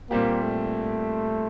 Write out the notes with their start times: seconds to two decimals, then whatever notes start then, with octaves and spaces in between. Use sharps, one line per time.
0.11 A#2 G3 A#3 C4 G4
0.42 A3